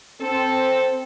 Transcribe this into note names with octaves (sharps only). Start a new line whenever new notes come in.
C4 A4